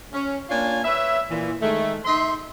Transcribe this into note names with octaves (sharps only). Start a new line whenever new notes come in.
C#4
A#3 D4 F4 C#5 G#5
B4 C#5 E5
A#2 E3
D#3 G#3 A3
D#4 E5 C6